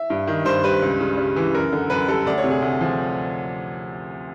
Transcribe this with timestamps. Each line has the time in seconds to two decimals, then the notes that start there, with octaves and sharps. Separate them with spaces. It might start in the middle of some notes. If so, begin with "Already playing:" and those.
Already playing: E5
0.10 G2
0.27 D#3
0.45 G2 C5
0.64 G3 B4
0.82 C#2
1.00 C#3
1.17 G3
1.36 E3
1.53 F#2 A#4
1.73 D3
1.90 F#2 B4
2.08 G3 A4
2.26 D2 D5
2.38 C#5
2.44 C3
2.50 G#4
2.62 D2
2.81 F3